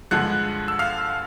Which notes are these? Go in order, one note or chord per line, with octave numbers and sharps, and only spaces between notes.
G2 D3 F3 G#3 F#5 F#6
E6
F5 F6